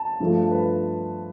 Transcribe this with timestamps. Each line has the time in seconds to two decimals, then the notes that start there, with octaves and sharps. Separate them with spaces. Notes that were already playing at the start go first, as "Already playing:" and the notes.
Already playing: A5
0.20 G2 F3 A3
0.51 B4